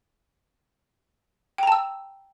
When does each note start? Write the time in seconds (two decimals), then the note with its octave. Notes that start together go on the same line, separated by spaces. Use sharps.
1.58 G5
1.63 A#5
1.67 A5
1.72 E6